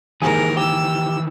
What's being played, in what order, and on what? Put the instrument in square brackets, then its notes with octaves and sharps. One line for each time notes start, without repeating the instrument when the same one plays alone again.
[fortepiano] D#2 G#2 [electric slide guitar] D#3 E3 [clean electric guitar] G#4 [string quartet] A#4
[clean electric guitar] G4 [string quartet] E6